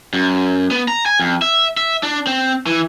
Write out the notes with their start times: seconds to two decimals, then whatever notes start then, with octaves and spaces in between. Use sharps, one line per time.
0.14 F#2
0.71 B3
0.88 A#5
1.06 G#5
1.20 F2
1.42 E5
1.78 E5
2.03 D4
2.27 C4
2.66 E3